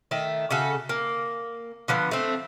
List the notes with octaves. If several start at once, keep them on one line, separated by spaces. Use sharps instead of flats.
D#3 A3 E5
C#3 F#4 A4
A#3
D3 F3 B3
A3 C4